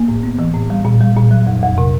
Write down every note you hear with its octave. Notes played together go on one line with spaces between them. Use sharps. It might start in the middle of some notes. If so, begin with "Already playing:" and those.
Already playing: A#3
A2
B3
E3
A2
G3
A#2
G3
A#2
F#3
F2
F2
C3